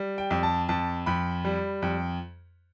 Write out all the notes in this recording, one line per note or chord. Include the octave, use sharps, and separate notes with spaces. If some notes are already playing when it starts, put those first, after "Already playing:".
Already playing: G3
G5
F2
A5
F2 A5
F2 B5
G3
F2